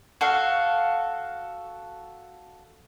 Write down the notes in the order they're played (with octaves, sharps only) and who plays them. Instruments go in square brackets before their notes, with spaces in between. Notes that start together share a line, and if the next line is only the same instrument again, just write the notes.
[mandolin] F#4 A4 F5